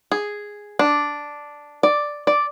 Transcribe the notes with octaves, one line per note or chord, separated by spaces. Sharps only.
G#4
D4
D5
D5